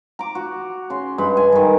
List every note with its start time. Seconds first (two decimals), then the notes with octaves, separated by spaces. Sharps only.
0.19 A#5 D6
0.35 F#4
0.90 C#3 C6
1.18 G2 G#3 B5
1.37 G#5
1.52 G2 D#3